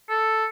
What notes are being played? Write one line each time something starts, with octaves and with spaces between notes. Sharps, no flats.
A4